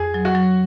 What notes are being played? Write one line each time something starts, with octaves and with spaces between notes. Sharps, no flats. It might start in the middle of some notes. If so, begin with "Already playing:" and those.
Already playing: F2 G#4
F#3
F#4
F#3